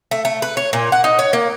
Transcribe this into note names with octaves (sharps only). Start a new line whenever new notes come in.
A3
A3
B4
C#5
A#2
F#5
D#4
C#5
A#3